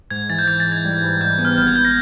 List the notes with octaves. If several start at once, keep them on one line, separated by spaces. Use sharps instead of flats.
G#2 G#6
E3 A6
G6
E3 G#6
A6
G#2
G#6
G3
G#2
G#2 G6
B3
F6
G#1 G6
G#6
G#1 G6
A#6